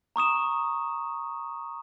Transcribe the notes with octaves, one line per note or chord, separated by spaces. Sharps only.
A#5 C#6 D#6 E7